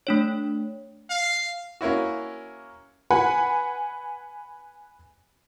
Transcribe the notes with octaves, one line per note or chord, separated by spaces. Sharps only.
A3 D4 C#5
F5
A#3 C#4 E4 F#4
B4 F#5 G#5 B5